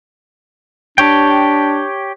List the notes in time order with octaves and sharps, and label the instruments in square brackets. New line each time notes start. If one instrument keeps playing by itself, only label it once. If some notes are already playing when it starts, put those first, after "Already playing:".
[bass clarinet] D4 [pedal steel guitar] G4 C#5 G5